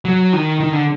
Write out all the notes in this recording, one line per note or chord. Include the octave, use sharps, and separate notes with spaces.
F#3
D#3
D#3
D3